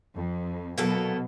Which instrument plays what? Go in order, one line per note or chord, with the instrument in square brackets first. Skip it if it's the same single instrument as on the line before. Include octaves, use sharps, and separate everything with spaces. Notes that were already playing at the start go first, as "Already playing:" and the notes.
[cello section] F2
[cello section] B2 F#3 [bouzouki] A#3 B3 A4